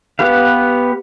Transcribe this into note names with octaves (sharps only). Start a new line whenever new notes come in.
B3 G4 B4 F5